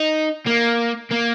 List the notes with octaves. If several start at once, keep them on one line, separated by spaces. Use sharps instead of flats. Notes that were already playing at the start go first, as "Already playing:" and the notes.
Already playing: D#4
A#3
A#3